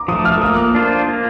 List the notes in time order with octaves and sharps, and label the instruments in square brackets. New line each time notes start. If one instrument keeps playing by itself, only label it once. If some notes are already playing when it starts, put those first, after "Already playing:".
Already playing: [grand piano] A#5 D6
[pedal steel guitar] F3 A3 [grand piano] D#6
[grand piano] F6
[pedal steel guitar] A#3 [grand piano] D#6
[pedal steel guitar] D4 F4 C5
A#3